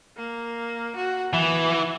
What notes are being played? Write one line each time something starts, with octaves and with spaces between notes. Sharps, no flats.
A#3
F#4
E3 B3